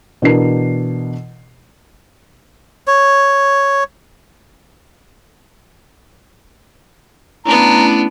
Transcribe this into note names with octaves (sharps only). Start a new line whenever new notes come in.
B2 E3 D4 A#4 C7
C#5
A3 B3 C#4 D4 E4 A#5